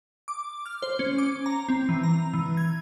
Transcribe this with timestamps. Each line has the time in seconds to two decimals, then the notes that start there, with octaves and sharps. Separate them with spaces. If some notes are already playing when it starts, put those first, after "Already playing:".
0.28 D6
0.66 F6
0.82 C5
0.99 C#4
1.18 D6
1.46 A#5
1.69 C4
1.89 E3
2.03 A#5
2.33 E3
2.57 G#6